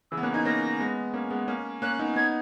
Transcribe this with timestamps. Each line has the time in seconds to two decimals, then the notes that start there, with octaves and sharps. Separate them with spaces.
0.11 C#3 E3 E6
0.17 B3
0.23 A#3 C#4 F#6
0.34 B3 D#4 G#6
0.45 A#3 C#4 A#6
0.79 G#3 B3
1.14 A#3 C#4
1.31 G#3 B3
1.48 A#3 C#4
1.82 A#3 C#4 F#6
1.99 B3 D#4
2.16 B3 D#4 G#6